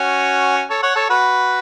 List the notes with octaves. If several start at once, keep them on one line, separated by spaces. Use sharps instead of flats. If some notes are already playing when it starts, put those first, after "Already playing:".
Already playing: C#4 F#4
A4 C#5
C#5 F#5
A4 C#5
F#4 B4